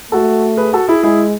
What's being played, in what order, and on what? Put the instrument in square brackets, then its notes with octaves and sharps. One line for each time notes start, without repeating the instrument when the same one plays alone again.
[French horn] A3 [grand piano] F#4 A4
[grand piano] G#4 B4
F#4 A4
E4 G#4
[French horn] G#3 [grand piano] E4 G#4